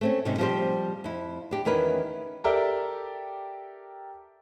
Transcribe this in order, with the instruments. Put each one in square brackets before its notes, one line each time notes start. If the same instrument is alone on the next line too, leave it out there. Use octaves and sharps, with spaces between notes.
[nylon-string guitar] A3 C4 C#4
G#2 C3 F#3 G3 C#4
F3 G3 C4 F#4 G4 C5
F2 E4
D4 G4
E2 D#3 C#4 E4 A#4 B4
[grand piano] G4 A4 A#4 D5 E5 G5